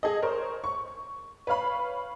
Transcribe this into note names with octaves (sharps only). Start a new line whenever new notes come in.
G#4 A4 D#5
A#4 C5 C#5
C#6
B4 C#5 F5 B5